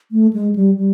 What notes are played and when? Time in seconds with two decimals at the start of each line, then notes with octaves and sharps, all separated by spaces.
0.12 A3
0.33 G#3
0.55 G3
0.77 G3